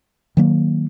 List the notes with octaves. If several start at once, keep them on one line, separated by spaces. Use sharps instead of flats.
D#3 F#3 A#3